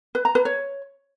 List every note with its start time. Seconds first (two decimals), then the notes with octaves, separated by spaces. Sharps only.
0.15 B4
0.25 A#5
0.35 B4
0.45 C#5